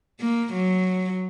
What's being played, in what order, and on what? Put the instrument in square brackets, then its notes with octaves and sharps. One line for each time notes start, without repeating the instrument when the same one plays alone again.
[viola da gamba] A#3
F#3